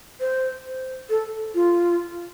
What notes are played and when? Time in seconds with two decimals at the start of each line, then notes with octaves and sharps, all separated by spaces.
0.20 C5
1.10 A4
1.55 F4